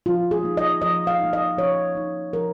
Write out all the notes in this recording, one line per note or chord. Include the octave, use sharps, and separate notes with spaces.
F3 F4
G#4
A#3 D#4
D#5
F3 D#5
F5
A#3 D#4
D#5
F3 C#5
A#3 D#4
F3 A#4